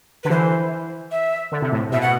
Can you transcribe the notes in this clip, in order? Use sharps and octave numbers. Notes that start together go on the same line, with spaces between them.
D3 B4
E3 C5
E5
D3
C3
A2
B2 E5
F#5